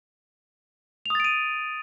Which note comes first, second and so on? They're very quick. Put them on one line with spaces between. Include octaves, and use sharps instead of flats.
F7 D#6 A6 D7 D#7